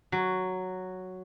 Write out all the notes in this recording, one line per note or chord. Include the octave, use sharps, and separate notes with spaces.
F#3